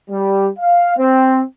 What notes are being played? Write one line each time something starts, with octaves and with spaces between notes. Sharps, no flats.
G3
F5
C4